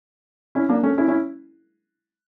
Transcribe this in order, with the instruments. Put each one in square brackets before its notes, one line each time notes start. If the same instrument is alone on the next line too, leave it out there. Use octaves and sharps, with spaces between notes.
[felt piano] C#4 E4
A#3 D4
A3 C#4
C#4 E4
C#4 E4